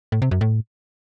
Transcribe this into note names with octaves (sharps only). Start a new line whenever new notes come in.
A2
C3
F#2
A2